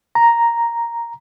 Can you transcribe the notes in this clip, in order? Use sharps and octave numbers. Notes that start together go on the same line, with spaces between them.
A#5